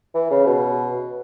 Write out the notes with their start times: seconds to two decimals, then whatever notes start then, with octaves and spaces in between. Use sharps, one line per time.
0.15 E3
0.31 C#3
0.46 B2